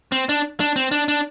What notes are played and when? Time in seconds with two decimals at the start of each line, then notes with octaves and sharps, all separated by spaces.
0.12 C4
0.29 D4
0.60 D4
0.76 C4
0.91 D4
1.08 D4